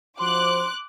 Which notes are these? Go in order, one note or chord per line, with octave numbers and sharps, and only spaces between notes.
F3 F#4 C5 C6 D6 F#6